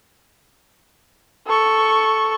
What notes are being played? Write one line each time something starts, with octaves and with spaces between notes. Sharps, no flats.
A4 C#6